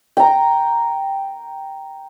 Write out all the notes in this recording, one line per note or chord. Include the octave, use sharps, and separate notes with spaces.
G5 A#5